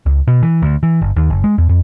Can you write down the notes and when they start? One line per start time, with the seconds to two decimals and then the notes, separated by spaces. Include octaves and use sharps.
0.06 C#2
0.28 B2
0.43 E3
0.62 D2
0.83 E3
1.01 G1
1.16 D#2
1.30 F#1
1.44 G#3
1.58 E2
1.69 F2